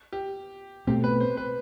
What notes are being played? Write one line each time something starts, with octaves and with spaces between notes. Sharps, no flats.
G4
B2 A3 C4 G4
B4
C5
B4